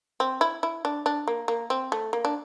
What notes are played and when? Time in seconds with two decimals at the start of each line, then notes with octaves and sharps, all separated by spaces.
0.20 C4
0.41 E4
0.63 E4
0.85 D4
1.06 D4
1.28 A#3
1.48 A#3
1.70 C4
1.92 A3
2.13 A#3
2.25 D4